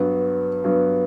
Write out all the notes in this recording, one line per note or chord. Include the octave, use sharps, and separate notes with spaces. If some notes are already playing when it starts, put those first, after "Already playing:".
Already playing: G2 F#3 B3
G2 F#3 B3